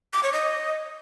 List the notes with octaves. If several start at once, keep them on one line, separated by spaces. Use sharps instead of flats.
D6
C#5
D#5